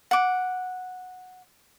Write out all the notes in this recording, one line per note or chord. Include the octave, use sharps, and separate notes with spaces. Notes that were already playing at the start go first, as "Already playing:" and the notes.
F#5 D6